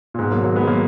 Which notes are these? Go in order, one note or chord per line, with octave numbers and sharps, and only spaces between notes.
A#2
G#2 B2
F#3 A#3
F#3 A#3
G#3 B3
F#3 A#3